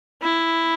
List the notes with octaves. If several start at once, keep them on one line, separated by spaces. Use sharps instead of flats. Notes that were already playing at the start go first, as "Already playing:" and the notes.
E4